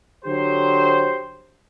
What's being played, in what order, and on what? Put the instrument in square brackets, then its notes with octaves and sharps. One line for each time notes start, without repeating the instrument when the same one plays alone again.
[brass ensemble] D3 F#3 G4 C5